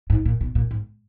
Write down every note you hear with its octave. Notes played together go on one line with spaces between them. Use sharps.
G#2
A#2
B2
A#2
G#2